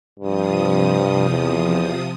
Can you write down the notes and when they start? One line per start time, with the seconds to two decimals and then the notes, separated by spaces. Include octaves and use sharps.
0.19 G2 C3 F3 D#6
1.30 E2